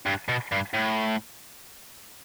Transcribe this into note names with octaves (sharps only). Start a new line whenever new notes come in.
G2
B2
G2
A2